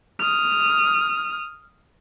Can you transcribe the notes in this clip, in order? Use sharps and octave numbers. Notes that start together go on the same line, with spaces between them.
D#6 F6